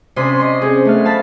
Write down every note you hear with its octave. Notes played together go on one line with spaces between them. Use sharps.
C3 C#4 D4 B5 C6 D#6
D#5 C6
C4 C#4 G#4
A3 B3 F6
F5 A5 B5